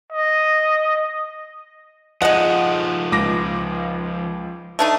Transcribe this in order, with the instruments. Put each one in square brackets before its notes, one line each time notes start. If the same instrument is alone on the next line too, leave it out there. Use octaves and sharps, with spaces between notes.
[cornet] D#5
[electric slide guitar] F3 D#4 [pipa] G#3 F#5 [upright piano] D#5
[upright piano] C#2 D6 A#6
[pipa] A3 D4 D#4